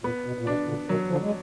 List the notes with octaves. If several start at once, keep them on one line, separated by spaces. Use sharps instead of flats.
A#2 B3
B2
A#2
B2 D4
A#2 D3
B2 D#3 F#3
D3 F3
G#3